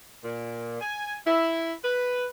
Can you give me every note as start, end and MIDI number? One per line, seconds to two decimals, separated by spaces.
0.24 0.79 46
0.81 1.15 80
1.26 1.73 64
1.83 2.26 71